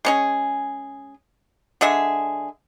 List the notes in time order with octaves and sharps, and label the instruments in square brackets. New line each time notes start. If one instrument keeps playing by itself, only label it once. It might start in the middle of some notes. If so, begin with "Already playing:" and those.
[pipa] G#3 C#4 G#4
D3 G#3 G#4 E5